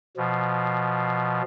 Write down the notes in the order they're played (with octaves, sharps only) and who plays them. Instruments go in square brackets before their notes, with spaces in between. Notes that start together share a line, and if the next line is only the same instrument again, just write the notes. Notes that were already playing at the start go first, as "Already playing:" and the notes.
[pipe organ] B2 F3